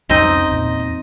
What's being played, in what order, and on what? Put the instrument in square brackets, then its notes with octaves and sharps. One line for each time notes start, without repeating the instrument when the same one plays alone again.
[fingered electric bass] C2 F2 C#4 [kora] C4 D#4 [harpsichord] D#5
[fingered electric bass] E2 A#2